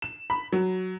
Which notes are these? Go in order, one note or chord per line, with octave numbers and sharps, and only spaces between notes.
E7
B5
F#3